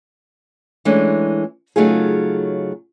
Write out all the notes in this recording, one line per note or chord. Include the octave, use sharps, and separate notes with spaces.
E3 G#3 A3 C#4 D4
C#3 F#3 A3 D#4 F4 G#4